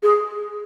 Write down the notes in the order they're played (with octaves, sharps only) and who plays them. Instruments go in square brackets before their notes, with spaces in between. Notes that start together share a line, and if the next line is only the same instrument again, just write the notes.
[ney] G#4